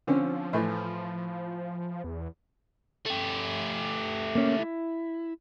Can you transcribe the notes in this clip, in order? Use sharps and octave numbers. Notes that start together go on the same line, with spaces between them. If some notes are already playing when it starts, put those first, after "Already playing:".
D3 F3 C4 C#4
A2 E3 A3
E2
A3 G4
A#3 C#4
E4